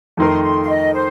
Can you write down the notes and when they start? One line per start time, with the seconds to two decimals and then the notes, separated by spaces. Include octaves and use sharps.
0.17 F2 D#3 A3 D#4 A#4 C6
0.43 C6
0.63 F5
0.69 D#5
0.94 C5